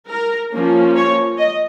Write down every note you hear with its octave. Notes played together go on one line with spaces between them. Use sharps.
A#4
F3 A#3 C#4
C#5
D#5